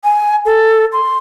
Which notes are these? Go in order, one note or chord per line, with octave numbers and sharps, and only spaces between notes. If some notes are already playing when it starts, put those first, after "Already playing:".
G#5
A4
C6